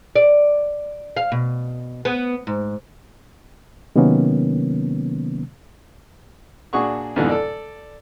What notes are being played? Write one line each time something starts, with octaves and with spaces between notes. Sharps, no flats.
D5
F5
B2
B3
G#2
C3 D#3 F#3 A#3 B3 C#4
A#2 D4 F#4 G#4 F#5 C#6
F2 G#2 B2 D3 E3
A4 D5